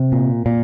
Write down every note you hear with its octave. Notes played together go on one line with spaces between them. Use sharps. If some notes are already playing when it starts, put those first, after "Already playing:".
Already playing: C3
A#2
A#2